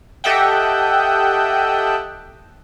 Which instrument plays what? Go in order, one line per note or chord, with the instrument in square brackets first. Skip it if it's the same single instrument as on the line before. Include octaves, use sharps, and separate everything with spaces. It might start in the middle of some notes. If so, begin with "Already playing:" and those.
[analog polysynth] G4 A4 D#5 E5 F#5 G5